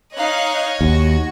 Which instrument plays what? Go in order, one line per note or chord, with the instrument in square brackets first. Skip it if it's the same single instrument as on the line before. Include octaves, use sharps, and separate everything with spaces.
[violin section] D#4 F5 F#6 [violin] C#5 D#5
[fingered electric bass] D#2 [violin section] F#4 C#6